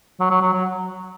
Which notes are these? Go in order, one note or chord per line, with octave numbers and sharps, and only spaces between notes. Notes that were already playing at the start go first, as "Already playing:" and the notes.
F#3
F#3
F#3
F#3